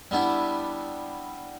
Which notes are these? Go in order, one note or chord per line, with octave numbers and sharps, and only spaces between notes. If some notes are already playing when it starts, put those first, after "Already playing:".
G3 B3 D4 E4